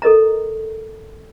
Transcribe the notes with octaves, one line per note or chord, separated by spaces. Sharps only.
A4 A#4 D#5 A#5